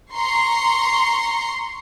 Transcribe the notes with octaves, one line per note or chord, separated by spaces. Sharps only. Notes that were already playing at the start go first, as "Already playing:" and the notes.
A#5 C6 C#6 C7